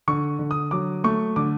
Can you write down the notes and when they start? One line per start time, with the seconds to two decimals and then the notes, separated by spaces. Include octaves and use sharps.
0.08 D3 C#6
0.39 D3
0.51 D#6
0.71 F#3 D6
1.04 A3 C#6
1.36 D3 D6